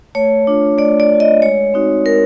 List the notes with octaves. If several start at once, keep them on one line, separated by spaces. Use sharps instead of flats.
A3 C#5
D4 F4
A3 D5
D5
D4 F4
D#5
G#3 C#5
C4 D#4 F#4
G#3 A#4